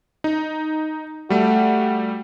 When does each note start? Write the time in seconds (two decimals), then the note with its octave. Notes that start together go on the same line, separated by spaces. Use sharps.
0.24 D#4
1.30 G3 A3 F#4